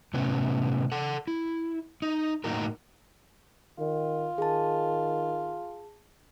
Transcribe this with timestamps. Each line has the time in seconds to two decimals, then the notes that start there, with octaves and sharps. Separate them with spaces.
0.14 A2 C3 B3 C#4
0.92 A4 F#5
1.28 E4
2.02 D#4
2.44 A2 A#3 D#4 F#4 A#4
3.79 D#3 F4
4.38 D#3 G#4 A5